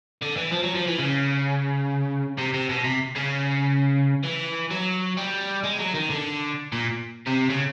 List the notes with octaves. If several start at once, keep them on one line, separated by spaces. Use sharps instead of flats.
D3
E3
F3
F#3
F3
E3
C#3
C3
C3
B2
C3
C#3
E3
F#3
G3
G#3
F#3
D#3
D3
A#2
C3
C#3